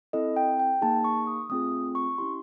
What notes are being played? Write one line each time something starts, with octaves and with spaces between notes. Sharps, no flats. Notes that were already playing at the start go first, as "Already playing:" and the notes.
C4 E4 A4 D#5
G5
G5
A#3 D#4 G#4 A5
C#6
D#6
A3 C4 F4 G#4 D#6
C#6
C#4 E4 G4 C6